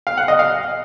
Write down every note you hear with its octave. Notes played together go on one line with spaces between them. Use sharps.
F5
F#5
D#5
F5